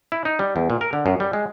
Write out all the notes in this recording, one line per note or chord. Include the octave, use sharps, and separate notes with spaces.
E4
D#4
G3
E2
A#2
A#4
D3
F#2
G3
G#3